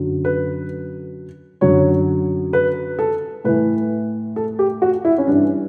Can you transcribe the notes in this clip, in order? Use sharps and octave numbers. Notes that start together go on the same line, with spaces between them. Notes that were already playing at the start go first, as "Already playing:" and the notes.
Already playing: F#2 D3 F#3
B4
F#2 D3 F#3 C#5
B4
A4
A2 E3 B4
A4
G4
F#4
E4
C#4
G2 E3 D4